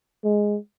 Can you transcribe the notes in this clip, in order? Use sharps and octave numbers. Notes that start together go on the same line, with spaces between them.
G#3